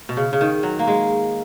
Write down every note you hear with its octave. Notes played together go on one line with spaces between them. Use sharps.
B2
C#3
C#3
D#3
F#3
A#3
G#3